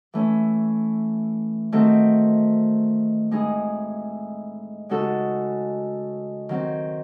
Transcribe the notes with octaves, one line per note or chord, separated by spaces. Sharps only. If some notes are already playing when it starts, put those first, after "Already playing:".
E3 A3 C#4
D#3 A3 C4 F#4
A2 G#3 D#4 G#4
C#3 G#3 D#4 F#4 A4
D#3 F#3 C4